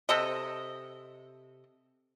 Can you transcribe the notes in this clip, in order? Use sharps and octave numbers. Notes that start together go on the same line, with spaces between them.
C3 A4 D#5